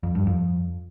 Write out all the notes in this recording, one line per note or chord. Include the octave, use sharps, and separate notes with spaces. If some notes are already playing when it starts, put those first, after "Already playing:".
F2
G2
F2